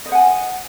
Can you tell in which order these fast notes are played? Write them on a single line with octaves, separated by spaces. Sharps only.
D#5 C5 F#5 G#5